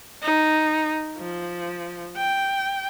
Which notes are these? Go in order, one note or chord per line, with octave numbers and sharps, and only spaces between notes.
D#4
F3
G5